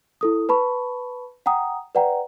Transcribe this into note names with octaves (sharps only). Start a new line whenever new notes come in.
E4 A4 D#6
B4 A5 B5 C#6
F#5 G5 A#5 D#6
B4 D5 F#5 G5 A#5